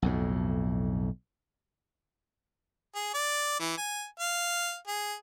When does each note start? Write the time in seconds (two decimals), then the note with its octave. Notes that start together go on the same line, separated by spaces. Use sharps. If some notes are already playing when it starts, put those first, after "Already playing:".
0.02 B1 F2 A2
2.95 G#4
3.14 D5
3.60 E3
3.77 G#5
4.20 F5
4.88 G#4